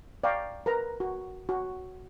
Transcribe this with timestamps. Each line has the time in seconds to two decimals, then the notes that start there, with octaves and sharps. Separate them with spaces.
0.24 D5 F5 G5 A#5 C#6
0.66 A#4 B4 A#5
1.00 F#4
1.49 F#4